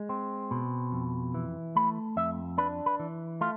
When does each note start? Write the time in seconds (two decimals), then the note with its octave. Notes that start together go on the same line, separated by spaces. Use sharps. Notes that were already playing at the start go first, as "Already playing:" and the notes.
Already playing: G#3
0.09 C4
0.51 B2
0.92 F2
1.34 E3
1.76 A3 B5
2.17 F2 E5
2.58 D4 B4
2.86 B4
3.00 E3
3.41 A3 F4